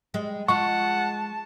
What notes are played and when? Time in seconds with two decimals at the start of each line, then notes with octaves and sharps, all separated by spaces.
0.14 G3 G#3
0.49 G#3 F4 F#5 A5 C#6